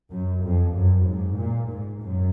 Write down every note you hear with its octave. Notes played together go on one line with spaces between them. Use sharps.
F#2
F2
F#2
G#2
A#2
G#2
F#2